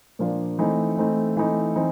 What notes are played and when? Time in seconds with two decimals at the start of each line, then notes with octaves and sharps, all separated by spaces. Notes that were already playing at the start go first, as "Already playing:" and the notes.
0.19 A#2 F3 A#3 D4 F4
0.59 E3 A3 C4 D#4
0.97 E3 A3 C4 D#4
1.37 E3 A3 C4 D#4
1.76 E3 C4 D#4